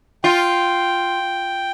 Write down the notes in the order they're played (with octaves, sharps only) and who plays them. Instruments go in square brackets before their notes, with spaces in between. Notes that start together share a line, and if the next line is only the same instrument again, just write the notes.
[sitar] F4 [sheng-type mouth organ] G5